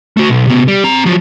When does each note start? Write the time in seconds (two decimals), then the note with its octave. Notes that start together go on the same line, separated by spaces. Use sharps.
0.17 A3 F#4
0.28 B1
0.47 C3 B3
0.68 G3
0.84 C4 A#5
1.06 F3 F#3